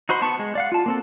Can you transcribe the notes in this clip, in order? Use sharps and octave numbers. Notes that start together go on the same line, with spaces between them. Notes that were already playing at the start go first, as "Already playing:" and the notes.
D#4 F#4 C5 B5 C6
B3 A5 C#6
G#3
D5 F5 F#5
F4 A5
A#3 C4 A4